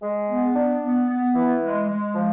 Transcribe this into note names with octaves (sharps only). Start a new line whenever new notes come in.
G#3
B3
D4
B3
B3
E3
G#3
G#3
F3